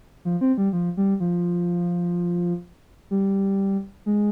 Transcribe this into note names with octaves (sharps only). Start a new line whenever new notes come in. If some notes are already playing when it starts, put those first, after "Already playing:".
F3
C4
G3
F3
G3
F3
G3
G#3